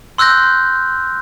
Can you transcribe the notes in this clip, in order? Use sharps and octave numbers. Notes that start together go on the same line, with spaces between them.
C6 E6 F#6 G6 A#6